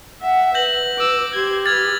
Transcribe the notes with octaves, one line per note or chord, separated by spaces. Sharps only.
E5 F#5
B4 G6 A#6 F#7
D6 E6
G4 C5 G#6
B4 E6 F6 G#6 A6